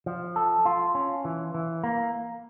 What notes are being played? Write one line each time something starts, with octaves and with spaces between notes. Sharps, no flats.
F3
A4
F4
C#4
E3
E3
A#3